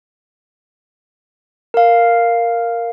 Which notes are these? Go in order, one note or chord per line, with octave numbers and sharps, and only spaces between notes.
A#4 F5